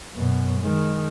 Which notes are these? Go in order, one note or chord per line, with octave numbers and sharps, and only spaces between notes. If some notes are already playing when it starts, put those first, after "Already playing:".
F#2 B2
D#3 G#3